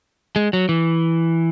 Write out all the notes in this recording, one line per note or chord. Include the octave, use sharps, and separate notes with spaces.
G#3
F#3
E3